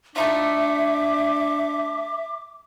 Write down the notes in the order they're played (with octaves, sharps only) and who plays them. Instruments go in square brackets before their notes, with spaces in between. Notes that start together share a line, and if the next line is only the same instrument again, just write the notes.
[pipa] A3 D#4 F4 [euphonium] D4 [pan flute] E5 [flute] D6